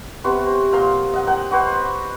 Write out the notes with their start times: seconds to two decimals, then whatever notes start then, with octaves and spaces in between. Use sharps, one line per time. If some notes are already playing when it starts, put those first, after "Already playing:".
0.24 C3 B3 F#4 C6
0.47 C5
0.72 A#2 F5 A#5 C6
1.13 D#5 F#5
1.27 A#4 F#5 G5
1.51 F#4 B4 C5